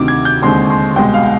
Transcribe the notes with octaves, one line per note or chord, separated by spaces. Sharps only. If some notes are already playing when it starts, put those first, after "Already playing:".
Already playing: D2 C3 D#3 D6
G#6
G6
D#2 D3 G#3 C4 C6
C6
C2 B2 G#3 G5
F5